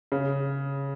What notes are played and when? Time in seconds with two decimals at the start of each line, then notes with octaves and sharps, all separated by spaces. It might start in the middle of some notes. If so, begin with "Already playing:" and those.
0.12 C#3